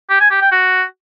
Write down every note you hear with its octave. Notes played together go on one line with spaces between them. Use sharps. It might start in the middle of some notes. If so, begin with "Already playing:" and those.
G4
G#5
G4
G5
F#4